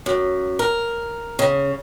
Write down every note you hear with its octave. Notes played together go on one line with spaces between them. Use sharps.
F#2
A#4
C#3